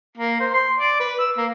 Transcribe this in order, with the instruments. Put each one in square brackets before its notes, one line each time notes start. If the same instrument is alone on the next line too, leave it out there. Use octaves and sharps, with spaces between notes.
[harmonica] A#3
C5
C6
D5
B4
E6
A#3